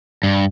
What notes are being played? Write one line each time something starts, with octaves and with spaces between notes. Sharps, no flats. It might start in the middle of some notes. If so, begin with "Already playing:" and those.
G2